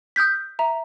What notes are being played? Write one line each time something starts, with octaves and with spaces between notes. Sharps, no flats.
D#6 F6 G6 B6
E5 A#5